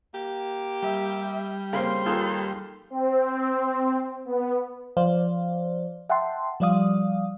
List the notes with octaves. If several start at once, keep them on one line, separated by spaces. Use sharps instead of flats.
A#3 G4
G3 E5
C#3 A#3 C4 C6
D#2 F4 G#4 A4
C4
B3
F3 C5 D5 F5
E5 F#5 G5 A5 C6
F3 G3 D5 F5 D#6